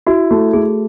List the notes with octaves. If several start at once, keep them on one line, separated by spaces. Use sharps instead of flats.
E4 F#4
A3 F#4
A3 G#4